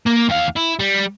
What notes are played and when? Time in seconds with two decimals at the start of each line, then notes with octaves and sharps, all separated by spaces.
0.06 A#3
0.29 D#2 F5
0.56 E4
0.79 G3